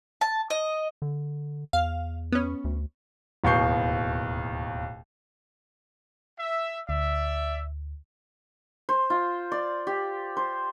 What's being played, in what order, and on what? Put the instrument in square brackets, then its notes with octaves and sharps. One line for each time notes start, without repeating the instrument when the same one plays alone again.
[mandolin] A5
D#5
[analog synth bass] D3
[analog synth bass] E2 [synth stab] F5
[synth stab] B3 C#4
[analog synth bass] D2
[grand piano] D1 D#2 B2 C#6 G6 C7
[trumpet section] E5
[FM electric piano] D2 [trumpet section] D5 E5
[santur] C5
F4
D5
G4
C5